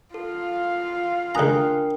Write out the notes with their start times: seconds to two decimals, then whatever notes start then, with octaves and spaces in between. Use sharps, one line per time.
0.14 F4 A4 F5
1.35 C#2 D4 A#4 G5 G#5 A#5 D#6 F#6